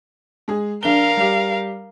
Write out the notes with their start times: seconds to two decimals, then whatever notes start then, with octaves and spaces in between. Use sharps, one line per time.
0.48 G#3 G#4
0.83 A#1 D4 A#4 F5 G7
1.17 G3 G4